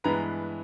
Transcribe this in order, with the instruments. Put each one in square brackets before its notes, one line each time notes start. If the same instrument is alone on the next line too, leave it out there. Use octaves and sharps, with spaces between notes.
[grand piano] G2 E3 G#3 B3 A#5